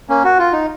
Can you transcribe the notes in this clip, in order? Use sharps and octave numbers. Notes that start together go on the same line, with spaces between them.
A#3 C#4
F#4
F4
D#4